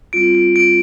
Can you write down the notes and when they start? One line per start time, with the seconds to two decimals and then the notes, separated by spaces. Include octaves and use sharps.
0.13 G3 C4 F4 D7
0.35 D7
0.56 D7